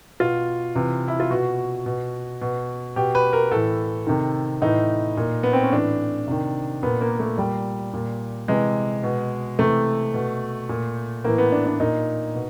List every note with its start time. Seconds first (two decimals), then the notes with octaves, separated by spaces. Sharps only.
0.20 B2 F4
0.75 C3 E3
1.08 E4
1.20 F4
1.30 B2 F#4
1.86 B2
2.41 B2
2.96 B2 G4
3.15 B4
3.33 A#4
3.51 A2 E3 A4
4.07 C3 D#3
4.62 A2 E3 D#4
5.17 A#2
5.43 B3
5.53 C4
5.63 C#4
5.72 A2 E3 D4
6.27 C3 D#3
6.83 A#2 B3
7.01 A#3
7.20 A3
7.38 A#2 G3
7.94 A#2
8.48 C3 E3 G#3
9.03 B2
9.59 C3 E3 A3
10.14 B2
10.69 A#2
11.24 A2 E3 A#3
11.38 B3
11.52 D4
11.66 D4
11.80 A#2 D#4
12.35 B2